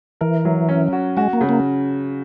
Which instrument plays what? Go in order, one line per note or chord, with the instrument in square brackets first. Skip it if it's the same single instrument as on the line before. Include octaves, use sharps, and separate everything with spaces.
[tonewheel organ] E3 [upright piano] A#4
[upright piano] F#3
C#4
F#4
[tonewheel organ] G#3 [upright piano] F#4
[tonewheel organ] A#3
[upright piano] C#3
[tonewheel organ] A#3